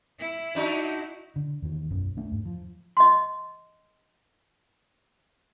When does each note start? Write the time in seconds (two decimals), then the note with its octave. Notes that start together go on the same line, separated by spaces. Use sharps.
0.20 E4
0.55 D4 D#4 F#4
1.36 D3
1.62 E2 D#3
1.91 B1 F#2
2.17 A3 D4
2.31 E2 G#2
2.45 F3
2.97 D#5 C6